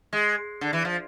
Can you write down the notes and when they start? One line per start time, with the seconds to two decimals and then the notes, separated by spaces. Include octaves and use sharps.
0.13 G#3
0.61 D3
0.73 E3
0.85 F3